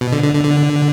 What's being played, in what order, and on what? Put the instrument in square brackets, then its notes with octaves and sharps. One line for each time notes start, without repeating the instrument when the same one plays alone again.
[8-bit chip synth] B2
D3
D3
D3
D3